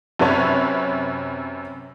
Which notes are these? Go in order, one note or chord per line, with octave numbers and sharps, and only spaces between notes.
F#2 C3 B4 C#5 E5